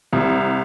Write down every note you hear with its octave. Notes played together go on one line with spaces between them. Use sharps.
C2